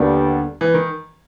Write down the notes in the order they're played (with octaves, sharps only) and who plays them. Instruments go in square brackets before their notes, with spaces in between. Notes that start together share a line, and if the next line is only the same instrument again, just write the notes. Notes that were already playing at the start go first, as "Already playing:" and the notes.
Already playing: [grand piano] D#2 D#3 [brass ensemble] D3 G3 B3
[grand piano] E3
D#3